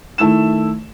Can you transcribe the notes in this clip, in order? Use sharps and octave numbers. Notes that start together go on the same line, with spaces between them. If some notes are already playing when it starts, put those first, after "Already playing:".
D#3 A3 E4 E6 E7